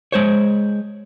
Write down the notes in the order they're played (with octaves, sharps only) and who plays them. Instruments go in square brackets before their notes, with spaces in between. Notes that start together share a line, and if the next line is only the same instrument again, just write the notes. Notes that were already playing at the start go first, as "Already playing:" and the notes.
[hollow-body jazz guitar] G#3 C5 C#5